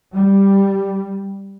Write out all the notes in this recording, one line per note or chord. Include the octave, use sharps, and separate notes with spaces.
G3